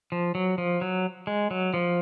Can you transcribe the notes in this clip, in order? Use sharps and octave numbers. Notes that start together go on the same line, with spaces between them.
F3
F#3
F3
F#3
G#3
F#3
F3